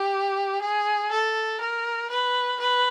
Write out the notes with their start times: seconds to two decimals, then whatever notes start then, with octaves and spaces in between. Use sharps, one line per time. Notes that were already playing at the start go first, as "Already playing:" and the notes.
Already playing: G4
0.61 G#4
1.11 A4
1.60 A#4
2.10 B4
2.60 B4